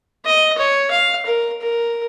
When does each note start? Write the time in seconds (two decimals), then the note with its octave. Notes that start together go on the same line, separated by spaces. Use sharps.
0.26 D#5
0.58 C#5
0.91 F5
1.26 A#4
1.61 A#4